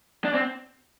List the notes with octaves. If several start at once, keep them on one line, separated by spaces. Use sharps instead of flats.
D4
C4